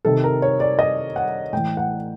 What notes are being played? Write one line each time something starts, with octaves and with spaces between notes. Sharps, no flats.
C3 D#3 A4
A#4
C#5
D5
D#5
F#5
A2 E3 G5
F#5